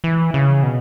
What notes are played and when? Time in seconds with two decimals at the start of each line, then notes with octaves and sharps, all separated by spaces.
0.04 E3
0.34 C#3
0.63 B2